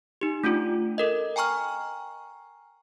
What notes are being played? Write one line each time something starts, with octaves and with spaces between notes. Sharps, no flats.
D#4 G4
A3 C#4 D4 F4
A4 A#4 D#5
G5 G#5 A#5 C#6 F6